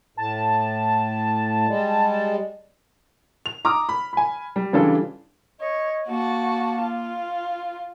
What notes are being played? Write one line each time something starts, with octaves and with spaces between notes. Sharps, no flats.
A2 A5
G3 G#3
F7
A#5 D6 D#6 F6
B5
G#5 B5
G3
C#3 E3 G3 D4 F4 A4
C#5 D#5
A#3 F#4 A5
F4